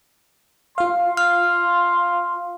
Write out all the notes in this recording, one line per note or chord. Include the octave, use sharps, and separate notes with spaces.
F4 F5 C6
F6